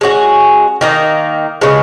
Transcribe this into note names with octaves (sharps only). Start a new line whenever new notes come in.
G#3 C#4 F#4
D#3 A#3 D#4
C#3 G#3 B3